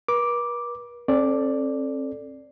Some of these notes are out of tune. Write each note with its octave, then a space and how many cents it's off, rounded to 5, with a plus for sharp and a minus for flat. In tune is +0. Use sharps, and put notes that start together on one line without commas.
B4 -45 D6 +0
C4 +40 A4 +0 D5 +0